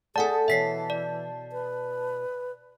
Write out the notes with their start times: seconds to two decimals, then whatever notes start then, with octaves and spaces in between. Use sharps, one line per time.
0.16 A3 G#4 A4 D5 F#5 G#5 A5
0.48 B2 E3 C#5 E5 B6 C7
0.90 D5
1.52 B4